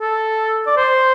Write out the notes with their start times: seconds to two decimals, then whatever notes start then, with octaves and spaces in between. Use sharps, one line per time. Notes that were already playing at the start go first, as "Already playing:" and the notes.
0.01 A4
0.67 D5
0.77 C5